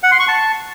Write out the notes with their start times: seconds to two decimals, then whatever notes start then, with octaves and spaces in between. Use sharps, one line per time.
0.03 F#5
0.11 C6
0.20 C#6
0.28 A5